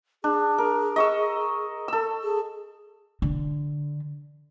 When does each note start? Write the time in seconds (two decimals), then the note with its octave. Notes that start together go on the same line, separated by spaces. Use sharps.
0.24 D4 G#4
0.58 A#4
0.96 D#5 C#6 E6
1.88 A4 E6
2.23 G#4
3.22 D3